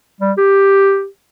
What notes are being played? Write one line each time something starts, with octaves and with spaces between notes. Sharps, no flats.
G3
G4